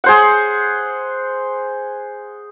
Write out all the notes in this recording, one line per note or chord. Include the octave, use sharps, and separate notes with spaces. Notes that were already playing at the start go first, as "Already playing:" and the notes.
G#4 C5 F#5